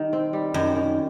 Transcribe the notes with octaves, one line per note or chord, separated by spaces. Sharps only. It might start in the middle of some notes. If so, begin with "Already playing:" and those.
Already playing: D#3 G3
C4
G3
F#2 D#3
D#3